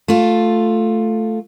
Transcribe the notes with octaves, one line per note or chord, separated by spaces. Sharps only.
A3 F4